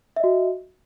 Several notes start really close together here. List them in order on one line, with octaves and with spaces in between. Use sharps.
E5 D#5 F#4